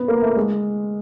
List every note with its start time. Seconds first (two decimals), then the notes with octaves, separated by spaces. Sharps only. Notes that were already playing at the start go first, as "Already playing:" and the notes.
Already playing: B3
0.08 A#3
0.22 A3
0.37 G#3